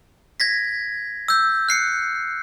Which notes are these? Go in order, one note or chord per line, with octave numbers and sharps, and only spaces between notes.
G#6 A#6 B6
E6 G6
F#6 C7 C#7